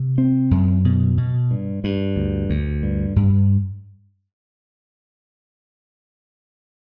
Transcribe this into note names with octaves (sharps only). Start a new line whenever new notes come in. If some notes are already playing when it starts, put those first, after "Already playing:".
Already playing: C3
C4
F#2
B2
B2
G2
G2
D2
D2
G2
G2